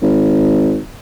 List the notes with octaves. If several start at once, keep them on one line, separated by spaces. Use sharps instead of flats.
G#1